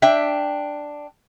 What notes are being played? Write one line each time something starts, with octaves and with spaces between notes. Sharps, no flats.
D4 E5 G5